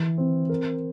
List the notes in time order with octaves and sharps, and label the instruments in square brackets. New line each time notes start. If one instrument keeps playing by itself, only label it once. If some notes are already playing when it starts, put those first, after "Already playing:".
Already playing: [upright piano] E3
C4
A#4